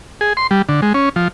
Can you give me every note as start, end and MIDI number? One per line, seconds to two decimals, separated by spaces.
0.21 0.33 68
0.37 0.47 84
0.51 0.62 55
0.69 0.81 50
0.82 0.93 56
0.94 1.09 61
1.16 1.28 53